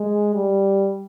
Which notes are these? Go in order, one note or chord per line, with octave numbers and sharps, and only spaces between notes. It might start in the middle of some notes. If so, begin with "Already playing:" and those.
Already playing: G#3
G3